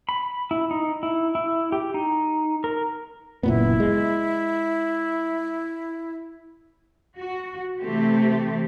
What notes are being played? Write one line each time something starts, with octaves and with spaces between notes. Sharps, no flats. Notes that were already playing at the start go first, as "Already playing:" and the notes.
B5
E4
D#4
E4
E4
G4
D#4
A#4
F#1 A#2 B3 E4
G#3
F#4
C3 E3 A3 C4 G4